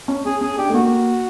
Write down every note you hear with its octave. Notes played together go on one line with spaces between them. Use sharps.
C#4
C#4 G#4
C#4 G#4
D4 G4
A3
A#3 F#4